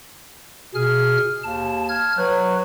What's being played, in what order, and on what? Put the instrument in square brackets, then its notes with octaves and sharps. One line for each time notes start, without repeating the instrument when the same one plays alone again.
[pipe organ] B2 F6 [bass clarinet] G#4
[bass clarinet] D#2 [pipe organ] A5
[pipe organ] F6 G#6
[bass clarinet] F#3 [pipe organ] B4